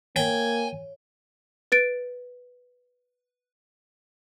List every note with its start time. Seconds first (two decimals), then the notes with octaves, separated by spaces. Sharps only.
0.16 A#3 C#5 G5 G#5
1.72 B4 A6 D7